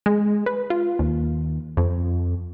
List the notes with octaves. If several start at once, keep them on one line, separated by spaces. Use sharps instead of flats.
G#3
B4
F4
D#2
F2